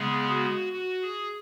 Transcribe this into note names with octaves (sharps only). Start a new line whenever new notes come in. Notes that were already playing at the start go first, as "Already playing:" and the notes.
Already playing: C#3 G#3 B3 G#4
F#4
F#4
G#4